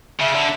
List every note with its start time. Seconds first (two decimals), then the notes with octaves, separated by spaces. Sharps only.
0.20 C#3 E5
0.35 D3